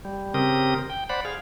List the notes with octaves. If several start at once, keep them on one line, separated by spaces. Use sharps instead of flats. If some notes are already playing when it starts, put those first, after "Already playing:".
G3
C#3 C4 G4 A#4 D#6
G5
C5 D5 F#5 B5
G#4 F5